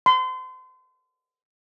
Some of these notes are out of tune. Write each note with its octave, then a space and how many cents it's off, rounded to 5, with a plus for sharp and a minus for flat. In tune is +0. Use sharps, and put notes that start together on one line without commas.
C6 -35